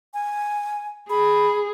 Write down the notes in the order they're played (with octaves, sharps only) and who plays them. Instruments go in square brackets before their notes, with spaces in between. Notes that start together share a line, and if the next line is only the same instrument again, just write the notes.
[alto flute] G#5
[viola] G#4 [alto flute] B5